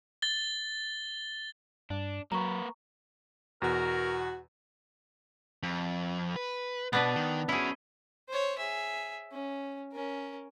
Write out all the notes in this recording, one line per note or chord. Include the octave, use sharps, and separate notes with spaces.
A6 G7
G2 D4
F#3 A#3 B4 A#5 C#6
E2 B2 F#4 A#4
F2
B4
B2 B3 D4 B4
D#3
C#4 E4 F#4 G#4
C5 C#5
G#4 E5
C#4
C#4 A#4